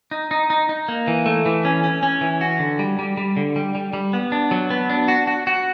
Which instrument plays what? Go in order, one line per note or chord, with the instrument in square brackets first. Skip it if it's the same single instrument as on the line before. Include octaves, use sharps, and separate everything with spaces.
[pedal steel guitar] D#4
D#4
D#4
D#4
A#3
E3
A3
E3
C#4
C#4
C#4
E3
F#4
D3
G3
G3
G3
D3
G3
G3
G3
B3
D4
F#3
B3
D4
F#4
F#4
F#4